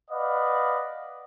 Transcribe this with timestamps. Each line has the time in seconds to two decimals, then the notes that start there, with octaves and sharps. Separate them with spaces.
0.11 B4 D5 D#5 F5 F#5